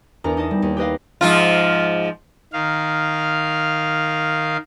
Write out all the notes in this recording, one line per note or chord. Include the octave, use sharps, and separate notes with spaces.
E2 D4 A#4 A#5
D#4 D#5 A5
G3
D#2
G4 B4 D#5 F5
G#2 F3 F4
D#3 F5